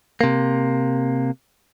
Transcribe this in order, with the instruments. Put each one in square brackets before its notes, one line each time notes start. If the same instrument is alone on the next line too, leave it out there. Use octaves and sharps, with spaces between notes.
[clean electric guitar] C3 A#3